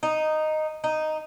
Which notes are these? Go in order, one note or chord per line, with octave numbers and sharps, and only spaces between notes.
D#4
D#4